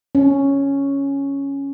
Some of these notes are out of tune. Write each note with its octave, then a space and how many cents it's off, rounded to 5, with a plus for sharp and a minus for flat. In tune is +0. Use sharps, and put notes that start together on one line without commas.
C#4 +0